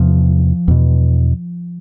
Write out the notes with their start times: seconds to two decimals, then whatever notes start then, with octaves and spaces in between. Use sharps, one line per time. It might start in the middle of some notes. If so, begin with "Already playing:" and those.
Already playing: E2 C3 F3
0.68 E2 B2